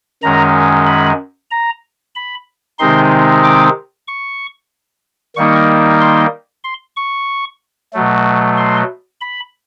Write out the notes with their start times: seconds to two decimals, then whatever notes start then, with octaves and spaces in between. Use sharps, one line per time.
0.23 F#2 D#3 G#3 C#4 A#5
0.87 B5
1.51 A#5
2.16 B5
2.79 C3 D#3 G#3 C4 D#4 C6
3.44 D6
4.08 C#6
5.36 D#3 G3 A#3 D#4 C#6
6.01 C6
6.64 C6
6.96 C#6
7.93 B2 F#3 A3
8.57 C6
9.21 B5